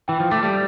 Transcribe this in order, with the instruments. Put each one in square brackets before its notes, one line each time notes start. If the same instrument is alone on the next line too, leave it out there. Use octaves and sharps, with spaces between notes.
[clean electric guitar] E3 [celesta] G5
[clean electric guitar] F3
[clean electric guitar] A3 [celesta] D6
[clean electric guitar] G3